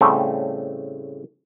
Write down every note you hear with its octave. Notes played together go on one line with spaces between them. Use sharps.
A2 C#3 G3 A3 C4